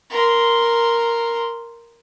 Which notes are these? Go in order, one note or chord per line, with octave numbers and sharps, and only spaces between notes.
A#4 C6